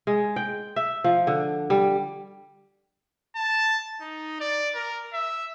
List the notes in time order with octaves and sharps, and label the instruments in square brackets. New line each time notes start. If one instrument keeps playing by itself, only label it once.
[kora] G#3
G5
E5
F3
D3
G3
[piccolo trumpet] A5
D#4
D5
A#4
E5